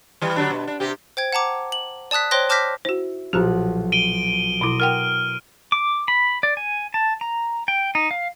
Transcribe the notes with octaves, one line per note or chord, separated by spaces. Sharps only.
E3 G3
D3 F#3 D4
B2
D4
C3 G4
C5 G5 G#6
F#5 A5 A#5 D6
F#7
D5 A5 D#6 F#6 B6
C5 C#5 G5 C6 F#6 A#6
A5 D6 F6 G6 A#6 B6
E4 F#4 C5
B1 A#2 F3 F#4 G4 F#6
D7 D#7 G7
B2 E4 A#5 C6 D#6
A#4 F#5 G5 F6
D6
B5
D5
G#5
A5
A#5
G5
D#4
F5